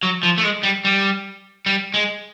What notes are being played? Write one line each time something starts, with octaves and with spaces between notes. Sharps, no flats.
F#3
F3
A3
G#3
G3
G3
G3
G#3